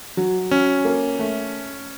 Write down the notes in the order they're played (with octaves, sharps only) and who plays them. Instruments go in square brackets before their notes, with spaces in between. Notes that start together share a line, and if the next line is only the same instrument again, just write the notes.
[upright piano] F#3
[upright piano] F#3 [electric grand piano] C#4
[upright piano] A#3
A3